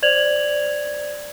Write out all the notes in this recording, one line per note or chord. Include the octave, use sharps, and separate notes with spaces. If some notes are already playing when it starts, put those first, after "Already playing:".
C5 D5 G#6 F7 F#7